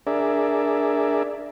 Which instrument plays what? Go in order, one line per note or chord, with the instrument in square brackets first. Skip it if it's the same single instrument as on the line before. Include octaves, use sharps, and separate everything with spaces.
[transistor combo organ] D4 G#4 A#4 D5 E5